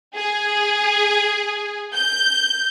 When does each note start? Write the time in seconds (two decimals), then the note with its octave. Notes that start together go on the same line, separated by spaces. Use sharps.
0.15 G#4
1.94 G6